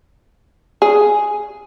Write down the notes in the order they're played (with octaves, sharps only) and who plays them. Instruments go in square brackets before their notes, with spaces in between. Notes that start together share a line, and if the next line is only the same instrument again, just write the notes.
[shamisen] G#4